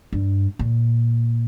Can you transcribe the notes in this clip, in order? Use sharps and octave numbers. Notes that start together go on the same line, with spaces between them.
G2
A#2